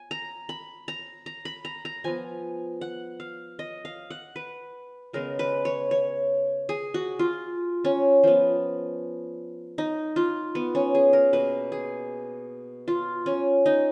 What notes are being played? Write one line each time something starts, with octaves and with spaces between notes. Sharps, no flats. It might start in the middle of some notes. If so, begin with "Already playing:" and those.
Already playing: G#5
A#5
B5
A#5
A#5
B5
A#5
A#5
F3 B3 G#5
F#5
F5
D#5
F5
F#5
B4
C#3 G#3 B3 A#4
B4
C#5
C#5
G#4
F#4
F4
C#4
F3 B3
D#4
F4
B3
C#4
G#4
A#4
B2 A#3 B4
G#4
F4
C#4
D#4